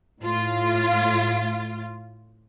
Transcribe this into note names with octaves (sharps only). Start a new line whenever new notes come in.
A2 F4